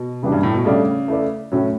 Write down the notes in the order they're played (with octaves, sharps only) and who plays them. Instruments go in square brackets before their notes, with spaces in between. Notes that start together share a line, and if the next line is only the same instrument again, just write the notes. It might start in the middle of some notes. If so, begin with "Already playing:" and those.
Already playing: [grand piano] B2
[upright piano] C#3 E3 G3 D4 G4
[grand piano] G2
A2
B2
[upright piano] A2 G3 D4 A4 D5 [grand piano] C#3
[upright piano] A3 E4 B4 D5
A2 F#3 C#4